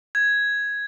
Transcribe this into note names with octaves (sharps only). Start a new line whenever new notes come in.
G#6